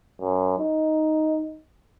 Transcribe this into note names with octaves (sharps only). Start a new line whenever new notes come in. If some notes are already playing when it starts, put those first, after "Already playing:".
F#2
D#4